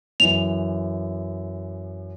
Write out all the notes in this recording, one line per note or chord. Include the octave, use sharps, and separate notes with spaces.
F#2 E3 F7